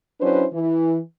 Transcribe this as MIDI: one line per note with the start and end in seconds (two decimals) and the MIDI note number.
0.20 0.45 54
0.20 0.45 61
0.20 0.45 62
0.20 0.45 64
0.20 0.45 71
0.20 0.45 72
0.53 0.99 52